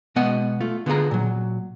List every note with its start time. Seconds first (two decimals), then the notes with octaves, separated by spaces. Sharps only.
0.16 B2 G#3 B3 D#5 F#5
0.61 A3 F4
0.86 D3 B3 F4 G#4 A#5
1.11 A#2 F#3